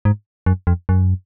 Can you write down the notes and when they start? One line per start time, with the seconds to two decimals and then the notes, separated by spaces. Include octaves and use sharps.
0.05 G#2
0.46 F#2
0.67 F2
0.89 F#2